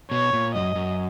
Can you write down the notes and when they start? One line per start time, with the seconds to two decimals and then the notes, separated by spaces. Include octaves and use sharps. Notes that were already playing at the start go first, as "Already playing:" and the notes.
0.11 B2 C#5
0.33 A#2
0.55 F#2 D#5
0.75 F#2